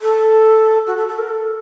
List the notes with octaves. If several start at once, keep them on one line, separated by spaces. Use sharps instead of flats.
A4
F#4
A4
A4
A#4
A4